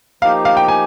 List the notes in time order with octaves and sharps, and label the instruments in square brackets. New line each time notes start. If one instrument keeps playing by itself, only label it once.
[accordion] F3 A#3 D#4 G4 [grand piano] F5
[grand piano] F5
G5
G#5